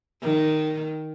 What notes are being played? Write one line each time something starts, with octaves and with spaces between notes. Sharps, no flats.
D#3